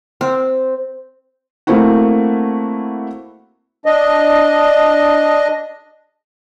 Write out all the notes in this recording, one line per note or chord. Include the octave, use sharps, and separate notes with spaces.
C4
A3 A#3 C4 E4 F#4
D4 D#5